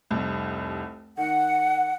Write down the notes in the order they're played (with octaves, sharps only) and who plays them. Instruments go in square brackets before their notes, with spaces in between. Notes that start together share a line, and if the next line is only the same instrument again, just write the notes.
[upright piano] F1 C2
[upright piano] D#3 [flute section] F#5